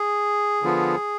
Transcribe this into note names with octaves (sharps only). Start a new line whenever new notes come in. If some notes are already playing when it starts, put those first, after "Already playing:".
Already playing: G#4
D3 F3 B3 F4